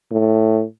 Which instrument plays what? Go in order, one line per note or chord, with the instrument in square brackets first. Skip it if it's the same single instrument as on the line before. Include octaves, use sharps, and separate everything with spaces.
[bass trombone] A2